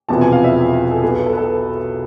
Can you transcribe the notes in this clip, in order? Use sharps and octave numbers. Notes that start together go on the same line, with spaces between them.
E1 E2 C3 F3 B3 A5
G#5
F5
E5
A4
B1 B2 B3 G#4
A4
A4
B4
A4